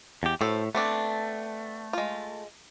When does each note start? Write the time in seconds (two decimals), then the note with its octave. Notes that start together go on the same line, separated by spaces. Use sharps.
0.23 E2 G4
0.41 A2 F#4 A4 C5
0.75 A3 B3 C4 D4
1.93 G#3 F4